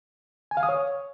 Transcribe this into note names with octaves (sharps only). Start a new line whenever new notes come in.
G#5
F5
D#6
C#5